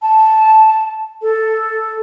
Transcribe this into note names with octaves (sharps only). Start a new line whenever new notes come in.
A5
A4